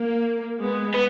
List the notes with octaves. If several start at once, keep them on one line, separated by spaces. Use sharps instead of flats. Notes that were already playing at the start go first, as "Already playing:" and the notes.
Already playing: A#3
G#3 B3
B3